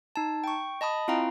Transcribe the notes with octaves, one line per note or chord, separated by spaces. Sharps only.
D#4 A5
G5 C#6
D#5 A5 B5 D#6
C4 E4 F4 F5 G5 A#5